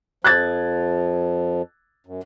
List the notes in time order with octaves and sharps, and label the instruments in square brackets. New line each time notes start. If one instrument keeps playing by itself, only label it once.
[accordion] F2 F3 [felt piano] F#6 G#6 A6
[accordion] F#2